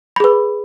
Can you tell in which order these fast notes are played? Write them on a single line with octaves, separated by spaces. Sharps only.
B5 G#4 B4